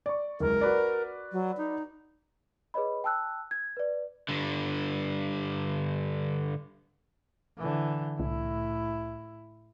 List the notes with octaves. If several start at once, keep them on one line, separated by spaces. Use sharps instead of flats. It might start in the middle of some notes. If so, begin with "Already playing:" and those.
D5 C#6
F#1 C#2 A#4
F#4 B4 D5
F#3
D#4
G#4 B4 C#5 D#5 B5
G5 A5 E6 F#6
G#6
B4 D5
G2 D3
D3 E3
C2 A2 E4